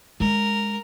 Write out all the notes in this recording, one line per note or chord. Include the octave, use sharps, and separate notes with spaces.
G#3 D4 A#4